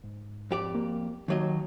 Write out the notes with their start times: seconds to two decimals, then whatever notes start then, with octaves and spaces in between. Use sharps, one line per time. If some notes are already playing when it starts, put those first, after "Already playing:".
0.04 G#2
0.51 F2 G4 D5
0.75 A#3
1.28 D#2 D#3 F#3 D#5